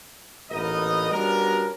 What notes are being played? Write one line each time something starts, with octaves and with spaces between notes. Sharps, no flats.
A1 A#2 B3 D#4 A#4 D#5
G3 B3 C#4 D4 F#4 A#4